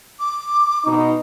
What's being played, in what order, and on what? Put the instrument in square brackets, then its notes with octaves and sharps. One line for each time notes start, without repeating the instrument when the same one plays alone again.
[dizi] D6
[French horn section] B2 D#4